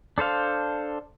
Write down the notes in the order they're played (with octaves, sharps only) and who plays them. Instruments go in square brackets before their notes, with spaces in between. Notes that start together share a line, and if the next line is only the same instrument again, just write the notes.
[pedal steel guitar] D4 A4 C5 F5